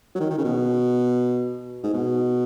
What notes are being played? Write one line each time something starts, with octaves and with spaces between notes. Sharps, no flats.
F#3
D#3
D#3
C#3
B2
G#2
B2